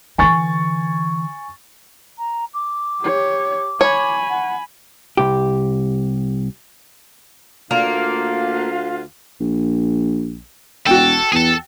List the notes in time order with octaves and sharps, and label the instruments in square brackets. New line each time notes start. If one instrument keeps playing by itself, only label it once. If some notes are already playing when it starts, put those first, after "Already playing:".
[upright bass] D3 E3 [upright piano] G#5 C#6 A6
[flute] A#5
D6
[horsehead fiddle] G4 C#5
[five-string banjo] C#5 [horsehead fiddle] G#5 B5
[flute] F#5
[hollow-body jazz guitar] C2 G4
[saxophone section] D2 F4 [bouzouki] A#3
[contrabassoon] A#1
[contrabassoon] E1 [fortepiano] F#4 G5 [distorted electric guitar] A4
[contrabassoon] E2 [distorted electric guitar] G#4 A4